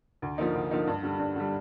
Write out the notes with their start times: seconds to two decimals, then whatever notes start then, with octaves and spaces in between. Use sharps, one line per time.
0.22 D2
0.38 D3 F3 A#3 D#4
0.55 D2
0.71 D3 F3 A#3 D#4
0.87 G2
1.03 D3 G3
1.19 G2
1.36 D3 G3